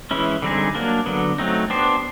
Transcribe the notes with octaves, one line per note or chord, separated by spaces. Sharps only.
E3 G#3 C#4 E4
D3 G3 C4 D#4 G#4
F#3 A#3 D4
D3 F#3 B3
F#3 A3 C4 D#4
B3 D4 G4 C5